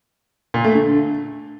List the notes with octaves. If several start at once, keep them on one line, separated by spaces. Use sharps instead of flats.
A#2
A3
D3